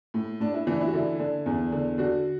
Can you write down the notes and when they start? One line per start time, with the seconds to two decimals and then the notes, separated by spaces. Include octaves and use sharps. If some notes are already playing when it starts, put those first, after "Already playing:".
0.14 A2
0.40 A2 D4
0.54 E4
0.67 E3 D4
0.80 E4
0.87 F#4
0.94 D3 E4
1.19 D3
1.46 E2
1.72 D3
1.98 D3 F#4